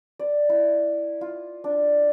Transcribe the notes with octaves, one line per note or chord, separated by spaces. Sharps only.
D5
E4
F4
D4